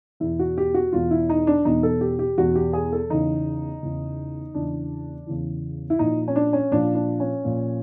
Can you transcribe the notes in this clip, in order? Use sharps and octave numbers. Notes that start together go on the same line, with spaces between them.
E2 B2 E4
F#4
G4
F#4
E2 B2 F4
E4
D#4
D4
E2 B2 D#4
A4
G4
G4
E2 B2 F#4
G4
G#4
A4
E2 C#3 E3 D#4
E2 C#3 E3
E2 C#3 E3 D4
E2 C#3 E3
E4
A#2 F3 D#4
C#4
D4
C#4
A#2 F3 D4
D4
C#4
A#2 F3